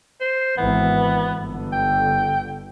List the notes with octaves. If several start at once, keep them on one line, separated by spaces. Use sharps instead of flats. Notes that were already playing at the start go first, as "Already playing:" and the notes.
C5
G#1 E3 B3
G1 D3
G5